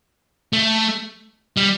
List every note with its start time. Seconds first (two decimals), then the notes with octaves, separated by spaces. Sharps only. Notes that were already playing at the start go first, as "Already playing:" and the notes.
0.53 A3
1.57 G3